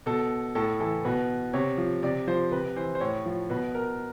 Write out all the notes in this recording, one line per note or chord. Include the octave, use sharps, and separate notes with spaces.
B2 A4
A2 A4
E3 A4
B2 B4
C3 C#5
F3
C3 D5
F3 C5
C3 B4
E3 C5
C5
A2 C#5
F3
B2 B4
A#4